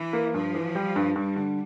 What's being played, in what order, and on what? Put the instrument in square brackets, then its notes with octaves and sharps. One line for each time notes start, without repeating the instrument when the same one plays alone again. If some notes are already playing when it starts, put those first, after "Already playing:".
Already playing: [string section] E3
[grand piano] A#3
[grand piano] G2 [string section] F3
[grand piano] E3
G3
G2
[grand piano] G2 [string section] G3
[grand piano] D3